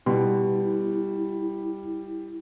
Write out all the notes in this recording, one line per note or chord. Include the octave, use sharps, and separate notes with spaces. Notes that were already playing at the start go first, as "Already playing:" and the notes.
B2 G3 E4